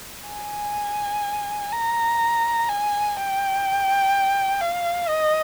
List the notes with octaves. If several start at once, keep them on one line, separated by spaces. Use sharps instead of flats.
G#5
A#5
G#5
G5
F5
D#5